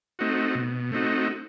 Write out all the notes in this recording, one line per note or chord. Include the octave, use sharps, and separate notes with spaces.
A3 C4 D#4 F#4
B2
A3 C4 D#4 F#4